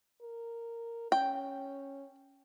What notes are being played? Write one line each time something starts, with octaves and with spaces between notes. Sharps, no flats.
A#4
C#4 G5